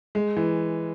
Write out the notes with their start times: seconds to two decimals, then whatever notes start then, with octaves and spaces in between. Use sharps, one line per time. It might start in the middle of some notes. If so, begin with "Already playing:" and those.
0.15 G#3
0.37 E3